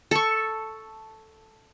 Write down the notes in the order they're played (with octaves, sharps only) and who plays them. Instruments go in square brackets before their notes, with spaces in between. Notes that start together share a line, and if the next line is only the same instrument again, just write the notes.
[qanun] A4 C#6